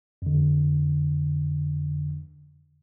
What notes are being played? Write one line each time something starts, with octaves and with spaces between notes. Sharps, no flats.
F2 D3